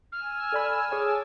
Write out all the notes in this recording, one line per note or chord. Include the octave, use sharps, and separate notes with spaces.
G#5 E6 F6
A4 D5 B5
G#4 C#5 G#5 A5 D6 E6